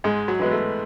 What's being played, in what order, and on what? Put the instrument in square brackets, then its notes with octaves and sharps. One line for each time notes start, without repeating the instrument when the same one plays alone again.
[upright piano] G#2 [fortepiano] G#3
[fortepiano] F#3
[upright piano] E3 G#3 B3
[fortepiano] A3